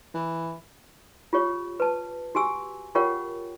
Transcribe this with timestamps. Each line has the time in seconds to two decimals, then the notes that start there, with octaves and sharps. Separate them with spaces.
0.14 E3
1.33 F4 G4 C#5
1.80 B4 A5
2.35 F#4 G4 G#5 E6
2.95 F4 G4 A#4 C#5 F#5 G5